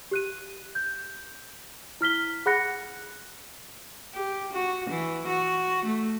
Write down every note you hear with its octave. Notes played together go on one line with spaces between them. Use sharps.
G4 F#6 D#7
G6
E4 F6 B6 G7
G#4 F#5 B5 F#6 A#6 C#7
G4
F#4
E3
F#4
A3